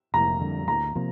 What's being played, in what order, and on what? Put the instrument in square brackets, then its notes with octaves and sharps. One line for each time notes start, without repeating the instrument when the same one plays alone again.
[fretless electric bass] F1 [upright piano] A#5
[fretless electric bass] F2 D3 G3
[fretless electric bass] D2 [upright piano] A#5
[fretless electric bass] C3 F3 A#3